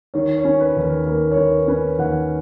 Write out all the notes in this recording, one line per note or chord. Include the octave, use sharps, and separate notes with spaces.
D#3 C#5
C#5
C#4
B4
D#2
A#4
A#3 A#4
C#5
D#3 B4
C#4 B4
D#2 F#5